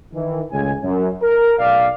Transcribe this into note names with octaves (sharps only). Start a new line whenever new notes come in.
D#3 E3
C#2 A2 G#3 G#5
F#2
A#4
B1 D5 F5